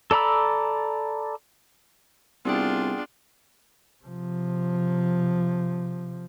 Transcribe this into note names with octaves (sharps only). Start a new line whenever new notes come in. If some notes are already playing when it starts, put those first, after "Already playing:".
A4 D5 A#5 B5 E6
C2 B3 D4 F4 G#4 G5
C3 F3